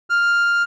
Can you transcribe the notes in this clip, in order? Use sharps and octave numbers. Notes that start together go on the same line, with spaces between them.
F6